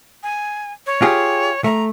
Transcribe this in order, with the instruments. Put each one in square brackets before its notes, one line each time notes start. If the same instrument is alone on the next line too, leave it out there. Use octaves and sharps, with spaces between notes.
[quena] G#5
C#5
[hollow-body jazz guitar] F4 G4 G#4
[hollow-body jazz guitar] A3 [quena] A#5